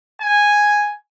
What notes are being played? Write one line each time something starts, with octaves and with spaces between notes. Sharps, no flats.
G#5